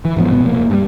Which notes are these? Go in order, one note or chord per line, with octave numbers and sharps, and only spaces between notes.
E3
G#2 F3 B3
F1 B2 B3
F1 A#3
G2 G3